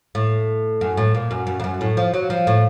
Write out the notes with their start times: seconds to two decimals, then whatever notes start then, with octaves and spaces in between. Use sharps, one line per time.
0.15 A2
0.81 F#2
0.97 A2
1.15 A#2
1.31 F#2
1.47 F#2
1.60 F2
1.64 F#2
1.81 A2
1.97 F3
2.14 F#3
2.30 F3
2.47 A2